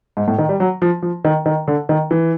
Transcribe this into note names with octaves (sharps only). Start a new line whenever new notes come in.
G#2
A2
D#3
G3
F#3
F3
F3
D#3
D#3
D3
D#3
E3